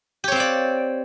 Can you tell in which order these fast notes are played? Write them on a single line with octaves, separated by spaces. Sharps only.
G4 C#5 C4 F5 D5